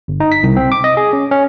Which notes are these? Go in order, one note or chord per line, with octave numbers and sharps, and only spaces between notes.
G1
D#4
B6
C2
C4
D6
D#5
G#4
C#4
C#4